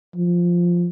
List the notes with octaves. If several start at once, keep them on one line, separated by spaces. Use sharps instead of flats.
F3